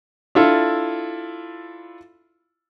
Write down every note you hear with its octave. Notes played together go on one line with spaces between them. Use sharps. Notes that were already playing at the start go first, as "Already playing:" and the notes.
D4 E4 F4 A4